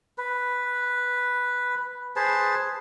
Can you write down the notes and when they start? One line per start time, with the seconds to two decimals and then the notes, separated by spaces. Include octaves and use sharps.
0.18 B4
2.16 G#4 B4 C5 A5